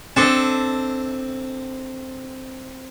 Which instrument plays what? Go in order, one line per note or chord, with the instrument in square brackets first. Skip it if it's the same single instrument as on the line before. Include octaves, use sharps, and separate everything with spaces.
[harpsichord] C4 [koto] D4 A4 D#5